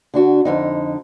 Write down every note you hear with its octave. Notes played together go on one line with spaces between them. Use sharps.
D3 D4 F#4
F2 D3 D#4